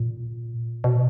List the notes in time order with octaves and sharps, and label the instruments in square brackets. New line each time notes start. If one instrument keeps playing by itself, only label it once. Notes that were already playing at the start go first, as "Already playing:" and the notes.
Already playing: [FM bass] A#2
B2